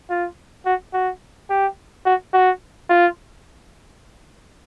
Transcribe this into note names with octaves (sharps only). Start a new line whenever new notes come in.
F4
F#4
F#4
G4
F#4
F#4
F4